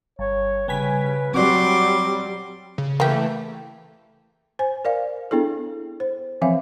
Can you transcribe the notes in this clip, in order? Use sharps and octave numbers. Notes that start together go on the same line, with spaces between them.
G1 C#5
C#3 G3 B4 G#5 B6
F#3 G3 C4 F#4 D5 C6 D6
C#3
E3 A3 A#3 G4
C5 G#5
A#4 D5 F5
B3 D4 E4 G#4 A4
C5
E3 F3 C4 E5 F5 G#5